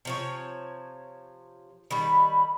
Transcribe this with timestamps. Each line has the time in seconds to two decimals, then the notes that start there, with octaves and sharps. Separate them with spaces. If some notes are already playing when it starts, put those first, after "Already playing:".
0.05 C3 F3 C#5
1.91 D#3 G3 B5